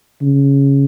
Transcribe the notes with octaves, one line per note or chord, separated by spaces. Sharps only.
C#3